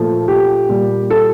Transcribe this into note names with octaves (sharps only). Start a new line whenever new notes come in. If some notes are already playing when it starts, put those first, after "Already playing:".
Already playing: A#2 F3 A3
G4
A#2 G3
A4